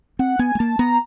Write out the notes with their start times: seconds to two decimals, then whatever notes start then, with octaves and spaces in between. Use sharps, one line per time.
0.19 C4 F#5
0.39 B3 G#5
0.55 A3
0.59 A#3 A5
0.79 B3 A#5